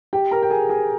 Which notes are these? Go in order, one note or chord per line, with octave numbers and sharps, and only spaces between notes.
G4 G5
A#4 A#5
G5
G#4 G#5
G#4 G#5